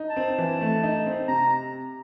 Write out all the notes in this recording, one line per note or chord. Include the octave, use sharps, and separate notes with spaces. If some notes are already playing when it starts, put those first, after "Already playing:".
Already playing: D#4
A5
C4
E3
A3
D#4
C4
C3 A#5